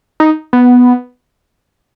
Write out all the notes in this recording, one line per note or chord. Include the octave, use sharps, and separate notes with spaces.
D#4
B3